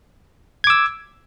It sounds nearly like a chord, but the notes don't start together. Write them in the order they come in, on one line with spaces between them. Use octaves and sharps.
G#6 D6 E6